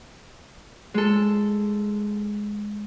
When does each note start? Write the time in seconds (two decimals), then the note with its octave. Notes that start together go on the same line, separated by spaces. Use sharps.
0.94 G#3 A4